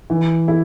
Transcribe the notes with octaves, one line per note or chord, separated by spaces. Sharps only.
E3
E4